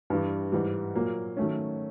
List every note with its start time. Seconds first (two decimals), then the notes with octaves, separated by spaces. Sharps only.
0.10 G2 E3 G3
0.52 G#2 E3 G3
0.95 A#2 F#3 A#3
1.37 D#3 F#3 A3 C#4